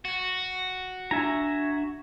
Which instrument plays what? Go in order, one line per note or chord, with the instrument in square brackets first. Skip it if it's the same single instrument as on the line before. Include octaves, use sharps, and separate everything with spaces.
[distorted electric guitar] F#4
[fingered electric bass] D4 [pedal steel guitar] E5 G#5 A#5